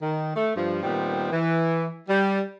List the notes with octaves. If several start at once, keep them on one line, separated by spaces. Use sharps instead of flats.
D#3
A3
G2 F3
A#2 D#3 G3 B3 C4
E3
G3